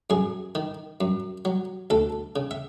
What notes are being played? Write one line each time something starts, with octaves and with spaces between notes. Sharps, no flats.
F#2 G#4
D#3
F#2
F#3
D2 A4
C#3
E5